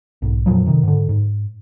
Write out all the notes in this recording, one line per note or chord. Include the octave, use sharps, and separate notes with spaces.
B1 G#2
F2 A#2 F3 F#3
C3 D#3
G#2 D3
G#2